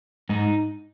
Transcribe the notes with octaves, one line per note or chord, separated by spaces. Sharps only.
G#2 D#4